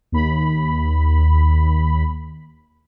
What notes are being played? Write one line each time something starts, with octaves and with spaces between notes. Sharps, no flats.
D#2 B5